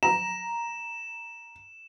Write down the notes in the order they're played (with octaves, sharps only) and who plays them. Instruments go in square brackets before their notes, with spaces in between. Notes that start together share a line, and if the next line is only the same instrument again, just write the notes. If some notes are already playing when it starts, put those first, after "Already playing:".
[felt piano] A#5 [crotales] E7